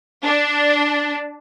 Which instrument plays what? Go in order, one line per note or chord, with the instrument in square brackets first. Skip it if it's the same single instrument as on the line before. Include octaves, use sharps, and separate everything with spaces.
[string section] D4